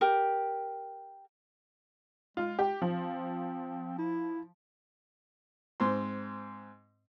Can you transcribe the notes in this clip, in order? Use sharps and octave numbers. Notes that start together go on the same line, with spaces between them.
G4 A#4
G#3 F4
G4
F3 C4
E4
G#2 C4 C6